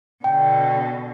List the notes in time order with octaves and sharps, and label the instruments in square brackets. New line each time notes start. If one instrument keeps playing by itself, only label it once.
[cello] B2 D3 [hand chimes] G5